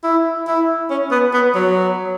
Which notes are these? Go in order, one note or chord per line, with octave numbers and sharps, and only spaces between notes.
E4
E4
C#4
B3
B3
F#3